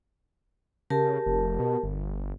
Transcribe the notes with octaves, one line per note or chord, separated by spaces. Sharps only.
C#3 G4 A#4 A5
F1
B2
G1